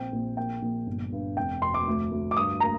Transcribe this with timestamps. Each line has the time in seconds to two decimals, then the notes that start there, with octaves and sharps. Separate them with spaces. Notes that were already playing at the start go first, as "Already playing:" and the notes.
Already playing: A#1 C4 G5
0.12 A#1
0.37 A#3 G5
0.62 A#1
0.87 G1
1.12 G2
1.37 F1 G5
1.62 F1 C6
1.74 D6
1.87 D2
2.11 D2
2.31 D6
2.37 G2 D#6
2.60 A#3 A#5